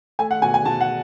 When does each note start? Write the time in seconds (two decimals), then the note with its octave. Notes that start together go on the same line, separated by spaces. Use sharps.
0.19 A3 G#5
0.31 F#5
0.42 B2 G#5
0.54 G#5
0.65 B2 A5
0.81 F#5